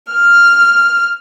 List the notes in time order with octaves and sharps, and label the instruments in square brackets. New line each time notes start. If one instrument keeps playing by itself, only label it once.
[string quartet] F6